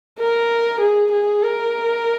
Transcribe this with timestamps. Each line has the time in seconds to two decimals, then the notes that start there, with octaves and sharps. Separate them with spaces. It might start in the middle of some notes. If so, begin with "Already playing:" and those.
0.19 A#4
0.81 G#4
1.12 G#4
1.43 A#4